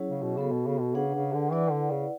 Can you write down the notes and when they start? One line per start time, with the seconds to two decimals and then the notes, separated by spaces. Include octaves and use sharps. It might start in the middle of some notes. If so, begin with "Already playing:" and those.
Already playing: F#3 C#4 E4 G#4 C#5
0.09 C#3
0.23 B2
0.37 C#3 B3 F#4 A4
0.52 B2
0.67 C#3
0.81 B2
0.95 C#3 D4 G#4 B4 F#5
1.14 C#3
1.33 D3
1.52 E3 E4 B4 D5 F#5
1.72 D3
1.91 C#3